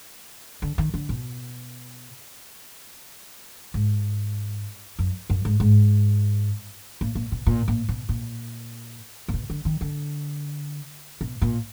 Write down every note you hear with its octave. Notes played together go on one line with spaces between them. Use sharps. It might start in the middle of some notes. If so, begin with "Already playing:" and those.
D3
D#3
D3
B2
G#2
F#2
F#2
G#2
G#2
A#2
A#2
B2
A#2
A#2
B2
A#2
A#2
B2
D3
D#3
D3
B2
A#2